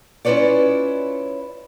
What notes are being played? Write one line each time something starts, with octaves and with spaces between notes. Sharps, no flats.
C#4 E4 F4 B4 C#5 D5